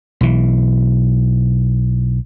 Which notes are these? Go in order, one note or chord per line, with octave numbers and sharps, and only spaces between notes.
B1 E3